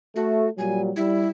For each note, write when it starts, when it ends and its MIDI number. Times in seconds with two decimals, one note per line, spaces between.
0.16 0.47 57
0.16 0.50 66
0.58 0.90 46
0.58 0.90 54
0.58 0.90 55
0.58 0.81 80
0.96 1.28 55
0.96 1.28 64